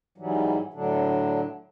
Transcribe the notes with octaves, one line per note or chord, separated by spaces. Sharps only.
G#2 E3 F#3 G3
A2 D3 F#3 D4